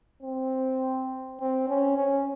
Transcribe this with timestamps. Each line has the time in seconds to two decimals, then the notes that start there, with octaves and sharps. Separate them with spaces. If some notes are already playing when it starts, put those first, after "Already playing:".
0.23 C4
1.40 C4
1.69 C#4
1.98 C#4